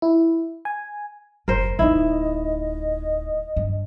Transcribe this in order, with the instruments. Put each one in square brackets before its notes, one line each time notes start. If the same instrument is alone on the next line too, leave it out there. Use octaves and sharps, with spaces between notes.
[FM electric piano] E4
G#5
[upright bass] F#1 [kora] A#4 C5
[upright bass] D1 D#4 [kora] E4 [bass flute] D#5
[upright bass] G2